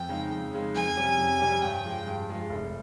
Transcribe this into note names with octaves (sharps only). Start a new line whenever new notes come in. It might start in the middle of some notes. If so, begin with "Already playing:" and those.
Already playing: F2 G5
C#3 G#3 D#4
F2
C#3 G#3 D#4
F2 G#5
C3 G3 C#4 G4
F2
C3 G3 C#4 G4
G2 G5
F3 G#3
G2
F3 G#3
F1